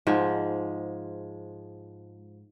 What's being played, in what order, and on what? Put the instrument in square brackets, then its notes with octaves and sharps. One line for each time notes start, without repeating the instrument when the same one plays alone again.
[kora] G#2 F3 G#3